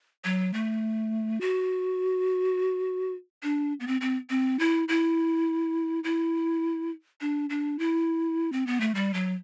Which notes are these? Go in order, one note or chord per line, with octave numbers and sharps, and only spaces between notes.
F#3
A3
F#4
D4
B3
C4
C4
C4
E4
E4
E4
D4
D4
E4
C4
B3
A3
G3
F#3